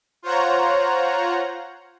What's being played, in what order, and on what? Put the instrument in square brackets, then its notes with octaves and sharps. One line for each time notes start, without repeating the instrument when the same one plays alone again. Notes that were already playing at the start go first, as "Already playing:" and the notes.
[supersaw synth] F4 C5 C#5 F#5 A#5